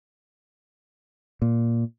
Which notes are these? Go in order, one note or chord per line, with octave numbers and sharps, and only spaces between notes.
A#2